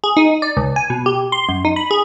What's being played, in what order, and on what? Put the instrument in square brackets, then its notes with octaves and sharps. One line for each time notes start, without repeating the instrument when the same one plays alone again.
[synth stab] G#4
D#4
D5
C#2
G#5
B2
G4
C6
F#2
D#4
B5
G#4